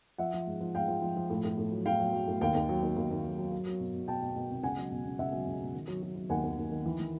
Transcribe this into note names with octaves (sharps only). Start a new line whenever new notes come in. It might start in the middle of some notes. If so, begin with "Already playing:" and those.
F3 E5 F#5
F3
G#2
F3
G#2 F5 G5
F3
F3
F3
A2
A2
A2
F#3
A2 F5 G5
F#3
F#3
A2
D#2 F5 G5
D#2
F#3
D#2
D#2
D#2
F#3
F#3
F#3
F#3
B2
B2
B2 G5 A5
B2
B2
C2
C#2 F#5 G#5
F#3
B2
C#2
C#2 E5 F#5
F#3
C#2
B2
D#3
F#3
F#3
F#3
D#2 F#5 G#5
D#2
D#2
D#3
E3
E3